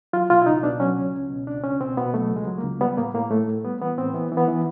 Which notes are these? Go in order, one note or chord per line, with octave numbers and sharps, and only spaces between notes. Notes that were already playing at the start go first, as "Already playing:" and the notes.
F#3 F4
B2 F4
E4
C#2 D#4
B2 D4
F#3 C#4
C#2
C#2
B2
C#2 D4
C#2 C#4
B2 C4
B2 B3
F#3 A3
C#2
G#3
F#3
A#3
C#2
G3 B3
A2 A#3
A2 A#3
A2 A3
A2
G3 B3
E3 B3
A2 C4
E3 B3
E3
B3
E3